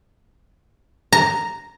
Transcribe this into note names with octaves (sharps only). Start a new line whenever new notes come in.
A#5